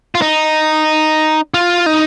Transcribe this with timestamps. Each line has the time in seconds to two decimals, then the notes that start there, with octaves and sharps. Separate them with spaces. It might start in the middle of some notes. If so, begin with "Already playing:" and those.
0.15 F4
0.22 D#4
1.54 F4
1.86 D#4